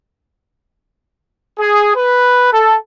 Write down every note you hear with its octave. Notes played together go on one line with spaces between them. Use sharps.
G#4
B4
A4